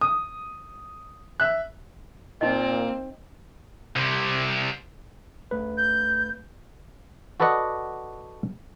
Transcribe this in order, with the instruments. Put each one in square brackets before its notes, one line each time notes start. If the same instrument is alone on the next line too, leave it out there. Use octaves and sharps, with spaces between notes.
[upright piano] D#6
E5 F#6
[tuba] A#2 [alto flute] A#3 [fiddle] C4 [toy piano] D#4 D#5
[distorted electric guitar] C2 C3
[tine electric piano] D2 A3 B4
[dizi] G6
[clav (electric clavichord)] F#4 A4 B4 D5 D#5 F#5